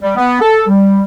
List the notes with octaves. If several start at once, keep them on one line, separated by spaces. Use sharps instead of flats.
G3
B3
A4
G3